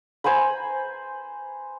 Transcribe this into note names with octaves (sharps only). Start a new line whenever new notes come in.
C5 G#5 A#5 B5